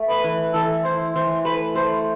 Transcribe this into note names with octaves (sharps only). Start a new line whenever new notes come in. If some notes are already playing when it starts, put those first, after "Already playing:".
Already playing: A3
B4
E3
E3 A4
E4 C5
E3 C5
A3 B4
A3 C5